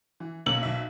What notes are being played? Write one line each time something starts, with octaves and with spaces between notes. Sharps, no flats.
E3
B1 A#3 C#4 E6 C#7 F#7
B1 E5